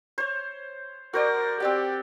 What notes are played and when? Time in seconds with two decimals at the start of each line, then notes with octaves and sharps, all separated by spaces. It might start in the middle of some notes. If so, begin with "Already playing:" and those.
0.18 C5 C#5
1.13 F#4 A#4 C5 D5
1.60 C4 G4 D5 F#5